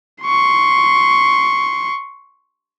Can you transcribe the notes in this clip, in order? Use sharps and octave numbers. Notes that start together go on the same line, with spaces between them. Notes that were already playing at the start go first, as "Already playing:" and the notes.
C6 C#6